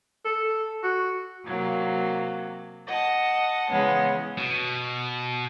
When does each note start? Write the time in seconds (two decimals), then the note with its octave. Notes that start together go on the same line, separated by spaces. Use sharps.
0.25 A4
0.83 F#4
1.44 C3 F#3 A#3
2.87 D#5 F#5 A5
3.71 C#3 E3 G#3 B3 C#4
4.38 B2